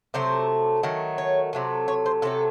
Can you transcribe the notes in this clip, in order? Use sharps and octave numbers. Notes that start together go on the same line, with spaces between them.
C3 F#3 A3 C5
D#3 F#3 A3
C#5
C3 F#3 A3
C#5
C5
C3 F#3 A3 A4